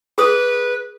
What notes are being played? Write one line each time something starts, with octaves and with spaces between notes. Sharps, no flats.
G#4 B4 D#6